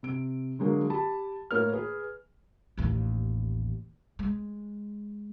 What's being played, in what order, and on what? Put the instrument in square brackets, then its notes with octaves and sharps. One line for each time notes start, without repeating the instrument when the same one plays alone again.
[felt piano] C3 D7
D3 F#3 G#3 A#3
G4 A5 B5
A2 A#3 A#4 C#5 F6
G#4 B4
[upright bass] A1 D#2
G#3